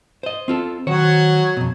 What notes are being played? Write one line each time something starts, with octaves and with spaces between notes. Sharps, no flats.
C5 D#5
C4 F4 A4
D#3 F#3 F#4 C5 C#5
F2 B2